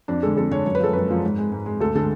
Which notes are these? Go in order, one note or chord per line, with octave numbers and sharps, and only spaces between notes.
F2 D4
D3 G#3 A4
F2 A4
D3 G#3 C#5
F#2 C#5
B4
F3 G#3 A4
F#2 B4
F3 G#3
G#2
G#3
G#2
G#3
D2 A4
D3 G#3 A4